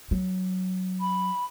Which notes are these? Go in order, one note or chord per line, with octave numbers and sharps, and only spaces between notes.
F#3
B5